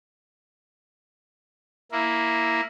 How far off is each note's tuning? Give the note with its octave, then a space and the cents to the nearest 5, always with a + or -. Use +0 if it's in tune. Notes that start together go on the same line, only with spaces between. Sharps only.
A#3 +0 E4 +0